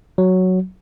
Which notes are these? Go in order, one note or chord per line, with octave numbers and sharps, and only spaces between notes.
F#3